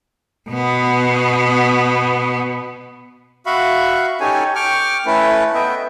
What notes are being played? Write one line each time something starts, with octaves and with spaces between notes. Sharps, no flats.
B2 B3
F#4 E5 F5 B5 C#6
C#4 D#4 G4 A4 C#5 G#5
G5 C#6 D6 F6
A3 C#4 E4 A4 B4
B3 D#5 E5 G5